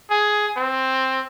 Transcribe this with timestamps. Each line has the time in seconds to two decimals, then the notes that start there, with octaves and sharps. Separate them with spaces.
0.10 G#4
0.57 C4